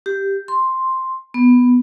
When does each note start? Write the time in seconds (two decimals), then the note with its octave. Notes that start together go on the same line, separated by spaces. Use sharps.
0.06 G4
0.48 C6
1.34 B3